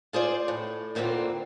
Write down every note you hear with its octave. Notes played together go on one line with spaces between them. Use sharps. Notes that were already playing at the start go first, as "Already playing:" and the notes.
F4 G#4 C5 D5
A2
D2 A#2 D3 E3 C4